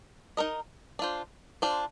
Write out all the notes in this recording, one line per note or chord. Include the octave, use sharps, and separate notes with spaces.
D#4 A#4 D#5
D4 F4 C5
D4 F4 C5